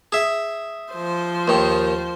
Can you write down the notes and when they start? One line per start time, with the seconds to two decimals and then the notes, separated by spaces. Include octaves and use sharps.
0.12 G#4 E5
0.93 F3 C5
1.48 D#2 D#3